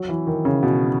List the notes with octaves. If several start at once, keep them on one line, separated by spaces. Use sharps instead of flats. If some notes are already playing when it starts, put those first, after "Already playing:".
Already playing: F#3
E3
D#3
C#3
B2